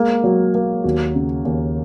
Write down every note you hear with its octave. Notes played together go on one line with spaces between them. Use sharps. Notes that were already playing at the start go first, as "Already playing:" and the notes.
Already playing: G#3 A#3
F#3
A#3
D#2 F#4
C#3
D#2